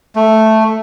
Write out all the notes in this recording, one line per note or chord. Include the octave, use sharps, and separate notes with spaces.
A3